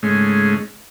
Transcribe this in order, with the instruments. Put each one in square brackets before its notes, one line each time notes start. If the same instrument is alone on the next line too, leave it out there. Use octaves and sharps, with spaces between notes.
[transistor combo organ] G#2 C#3 G#3 A3 C#4